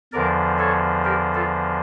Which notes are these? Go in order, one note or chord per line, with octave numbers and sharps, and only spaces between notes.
E2 D3 F3 A#4 D5
A4 C#5
G4 A#4
F4 A4